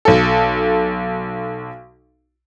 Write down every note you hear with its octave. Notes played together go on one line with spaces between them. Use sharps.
B1 A4